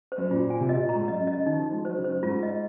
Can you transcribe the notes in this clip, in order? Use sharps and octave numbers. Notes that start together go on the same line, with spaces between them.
C5
F#2
A#2 F4
G#5
C3
A#2 D#5
A#2
A#5
G#2
F#2 D#5
F#2
D#5
C#3
D#3 D#4
F3
D#4
G#3
F#3 C5
C#3
C5
F#2
G#2 F4
D#5